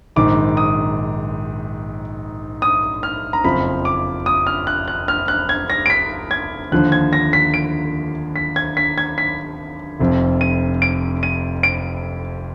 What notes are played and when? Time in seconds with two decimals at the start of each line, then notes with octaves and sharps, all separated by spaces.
0.16 A#1 G#2 D#3 D6
0.57 D#6
2.62 D#6
3.03 F6
3.33 A#5
3.44 F#1 F2 F3 B5
3.85 D6
4.26 D#6
4.47 F6
4.67 F#6
4.88 F#6
5.08 F6
5.28 F#6
5.49 G#6
5.70 A#6
5.86 D7
5.90 B6
6.31 G#6
6.72 D#2 D3 F3 F#6
6.92 G#6
7.13 A#6
7.33 B6
7.54 D7
8.36 B6
8.56 G#6
8.77 B6
8.98 G#6
9.18 B6
10.00 F1 F2 F3
10.41 D#7
10.82 D7
11.23 D#7
11.63 D7